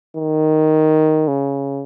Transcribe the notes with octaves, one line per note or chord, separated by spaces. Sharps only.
D#3
C#3